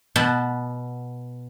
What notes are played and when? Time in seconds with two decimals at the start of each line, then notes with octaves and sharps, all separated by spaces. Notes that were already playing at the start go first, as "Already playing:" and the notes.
0.16 B2 B3 A5